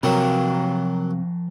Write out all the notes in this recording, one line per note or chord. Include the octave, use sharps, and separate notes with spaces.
C3 F3 F#3 A#3 A#4 G5